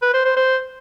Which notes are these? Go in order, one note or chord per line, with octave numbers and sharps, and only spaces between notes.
B4
C5
C5
C5